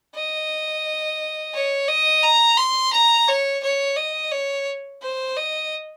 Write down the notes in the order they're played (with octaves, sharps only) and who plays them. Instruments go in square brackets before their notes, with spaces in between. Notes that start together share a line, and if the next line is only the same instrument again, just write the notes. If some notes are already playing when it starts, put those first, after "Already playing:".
[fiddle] D#5
C#5
D#5
A#5
C6
A#5
C#5
C#5
D#5
C#5
C5
D#5